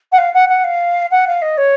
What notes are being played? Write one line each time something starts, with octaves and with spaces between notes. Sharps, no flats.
F#5
F5
F#5
F#5
F5
F#5
F5
D#5
C#5